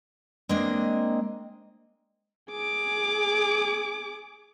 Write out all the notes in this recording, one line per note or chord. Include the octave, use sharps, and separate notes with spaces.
G#3 A#3 C4 D4 D#5
G#4 D6